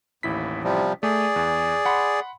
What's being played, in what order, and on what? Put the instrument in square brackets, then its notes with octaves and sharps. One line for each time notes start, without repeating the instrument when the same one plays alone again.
[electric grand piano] A1 E4 B6 [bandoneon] D#2
[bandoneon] C3 F3 G3
[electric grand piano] A3 [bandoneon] G#4 D5
[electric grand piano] E2
F#5 B5 C6